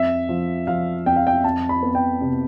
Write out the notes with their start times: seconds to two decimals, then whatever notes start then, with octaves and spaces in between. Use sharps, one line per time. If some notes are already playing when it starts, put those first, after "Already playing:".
Already playing: F2 E5
0.29 F3
0.67 F3 F5
1.06 F2 G5
1.16 F5
1.27 G5
1.44 F2 A5
1.69 B5
1.83 B3
1.95 G5
2.21 C3